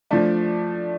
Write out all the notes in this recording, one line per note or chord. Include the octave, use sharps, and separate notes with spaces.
F3 A3 D4